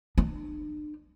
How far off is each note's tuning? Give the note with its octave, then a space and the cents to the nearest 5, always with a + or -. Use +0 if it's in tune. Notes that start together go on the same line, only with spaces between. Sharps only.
D4 +40